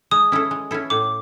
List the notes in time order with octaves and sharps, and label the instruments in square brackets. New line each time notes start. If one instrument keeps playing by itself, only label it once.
[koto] G#3 [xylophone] D#6
[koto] C#4 E4 A4
G#3
C#4 E4 A4
[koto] A2 [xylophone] D6